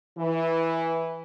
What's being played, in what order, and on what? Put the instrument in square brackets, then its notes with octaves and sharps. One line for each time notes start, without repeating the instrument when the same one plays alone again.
[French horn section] E3